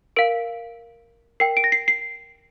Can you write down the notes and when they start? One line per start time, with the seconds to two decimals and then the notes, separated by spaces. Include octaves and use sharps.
0.16 A#4 F5 D7
1.40 A#4 G5 C7
1.57 D7
1.64 A#6
1.72 C7
1.88 C7